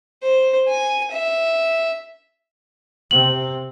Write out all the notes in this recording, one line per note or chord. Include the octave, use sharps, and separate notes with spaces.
C5
G#5
E5
C3 C4 F#7